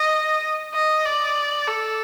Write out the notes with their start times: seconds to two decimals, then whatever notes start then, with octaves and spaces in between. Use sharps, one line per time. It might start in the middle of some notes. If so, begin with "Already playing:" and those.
Already playing: D#5
0.74 D#5
1.05 D5
1.68 A4